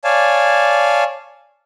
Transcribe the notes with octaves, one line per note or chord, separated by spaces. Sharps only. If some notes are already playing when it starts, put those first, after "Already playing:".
C#5 D5 F5 G#5 A5